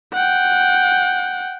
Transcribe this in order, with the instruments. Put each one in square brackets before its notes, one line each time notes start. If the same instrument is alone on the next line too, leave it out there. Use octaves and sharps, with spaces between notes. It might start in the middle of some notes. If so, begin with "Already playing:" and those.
[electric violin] F#5 G5